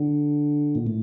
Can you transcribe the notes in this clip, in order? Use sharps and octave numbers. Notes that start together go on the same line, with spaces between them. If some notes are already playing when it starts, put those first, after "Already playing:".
Already playing: D3
A#2
A2